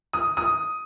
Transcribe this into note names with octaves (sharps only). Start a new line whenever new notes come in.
D#6
D#6